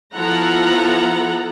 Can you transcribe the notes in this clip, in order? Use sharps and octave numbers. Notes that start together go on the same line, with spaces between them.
F3 B3 E4 A4 F#5 A#5